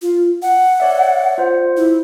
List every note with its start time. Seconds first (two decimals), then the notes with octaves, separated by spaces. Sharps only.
0.02 F4
0.42 F#5
0.80 C#5 D5 E5
1.38 F4 C5
1.77 E4